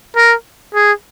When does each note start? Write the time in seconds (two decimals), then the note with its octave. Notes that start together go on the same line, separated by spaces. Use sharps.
0.17 A#4
0.75 G#4